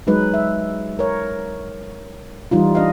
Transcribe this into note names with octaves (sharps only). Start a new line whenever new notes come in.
F#3 G#3 D#4 B4
E5
A#4 C#5
E3 G3 D#4 F4
D4 D#5 F5